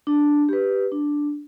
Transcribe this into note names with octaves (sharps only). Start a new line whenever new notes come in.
D4
G4 B4
D4